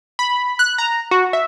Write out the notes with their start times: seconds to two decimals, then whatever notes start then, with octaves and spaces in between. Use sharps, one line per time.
0.19 B5
0.59 F#6
0.78 A#5
1.11 F#4
1.33 E5